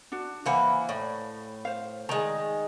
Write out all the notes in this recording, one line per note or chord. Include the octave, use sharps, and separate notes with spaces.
D4 F#4
E3 A#3 C5 F#5 B5
A2
C5 F5
D#3 G#3 A#5